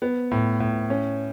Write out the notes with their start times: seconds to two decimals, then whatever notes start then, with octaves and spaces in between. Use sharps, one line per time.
0.02 B3
0.31 A2
0.60 A2
0.90 C#4